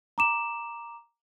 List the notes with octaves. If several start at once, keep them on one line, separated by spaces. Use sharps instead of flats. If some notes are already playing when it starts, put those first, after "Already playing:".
A#5 D6 E7